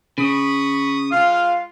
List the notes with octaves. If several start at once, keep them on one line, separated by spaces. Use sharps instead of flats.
C#3 B5 C#6 D#6
G#3 F4 F5